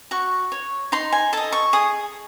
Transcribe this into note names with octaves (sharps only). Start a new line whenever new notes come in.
F#4 C#6
C#5
D#4 C6
G#5
A4 D#5 A5
C#6
G#4 D#6